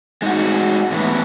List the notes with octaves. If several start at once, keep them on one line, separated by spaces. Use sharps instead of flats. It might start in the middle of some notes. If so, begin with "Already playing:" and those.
G#3 D#4 F#4
A2 E3 B3 E4 B4